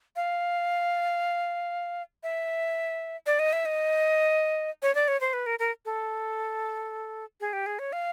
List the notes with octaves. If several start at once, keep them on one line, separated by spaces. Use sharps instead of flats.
F5
E5
D5
D#5
E5
D#5
C#5
D5
C#5
C5
B4
A#4
A#4
A4
G#4
G4
G#4
C#5
F5